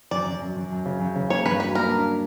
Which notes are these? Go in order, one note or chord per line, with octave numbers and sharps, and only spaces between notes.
F#2 D5
F#2
F#2
F#2
F#2
C#3
F#2
C#3
A#3 C#5
G2 B4
F#3 B4
A#3 A#4
D4